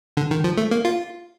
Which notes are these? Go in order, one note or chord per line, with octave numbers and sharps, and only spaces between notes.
D3
D#3
F3
A3
A#3
F4